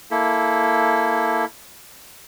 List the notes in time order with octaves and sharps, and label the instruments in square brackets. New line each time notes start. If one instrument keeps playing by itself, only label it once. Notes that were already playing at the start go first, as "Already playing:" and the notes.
[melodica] A#3 E4 A4